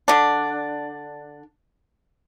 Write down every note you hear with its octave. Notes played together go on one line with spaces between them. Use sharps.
D3 D4